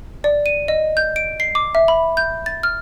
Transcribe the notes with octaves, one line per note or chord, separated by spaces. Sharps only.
D5
D#7
D#5
G6
D7
C7
D6
E5
B5
G6
A6
F6